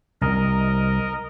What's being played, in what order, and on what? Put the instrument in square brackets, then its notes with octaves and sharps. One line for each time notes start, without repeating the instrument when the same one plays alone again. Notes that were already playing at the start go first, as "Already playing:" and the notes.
[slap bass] C2 [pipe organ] A#4 D#5